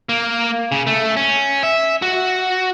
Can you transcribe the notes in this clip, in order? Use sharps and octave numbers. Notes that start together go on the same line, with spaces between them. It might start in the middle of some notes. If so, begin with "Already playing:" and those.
A#3
C#3
A3
C#4
E5
F#4